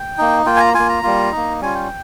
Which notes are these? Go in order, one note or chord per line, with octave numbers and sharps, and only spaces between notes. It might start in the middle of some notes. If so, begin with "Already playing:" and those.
Already playing: G5
A#3 D#4
A#3 F4 G5
G#5
A#5
A#3 F4 G#5
A#5
G3 A#3 F4
A#3 D#4
G3 C#4 F4 G#5
G5